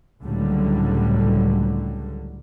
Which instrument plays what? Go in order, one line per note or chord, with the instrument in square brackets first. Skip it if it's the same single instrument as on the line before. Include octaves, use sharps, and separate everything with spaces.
[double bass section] C#2 A2 D3 F#3 G3